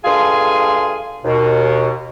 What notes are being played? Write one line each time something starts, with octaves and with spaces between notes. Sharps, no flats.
G2 A3 F4 G#4 G#5 C6
D#2 B2